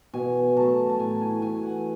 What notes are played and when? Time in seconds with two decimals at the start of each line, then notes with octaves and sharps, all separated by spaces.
0.13 B2 G#5
0.56 F#3 A3 A5
0.89 A5
0.99 A2 G#5
1.21 G#5
1.42 E3 A3 G#5
1.63 F#5